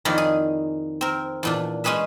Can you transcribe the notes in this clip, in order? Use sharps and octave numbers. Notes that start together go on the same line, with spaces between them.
F2 D#3 A#3 E4 A#4 D5
G#4
C4 A#4
E2 A#2 D4
G#3 C#4 G#4 B4 E5